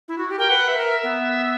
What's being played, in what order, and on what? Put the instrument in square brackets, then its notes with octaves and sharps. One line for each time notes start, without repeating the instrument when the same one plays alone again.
[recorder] E4
F#4
G4
[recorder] A#4 [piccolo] G5
[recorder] B4 [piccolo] F#5
[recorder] B4 [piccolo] E5
[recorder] A#4
[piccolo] E5
[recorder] B3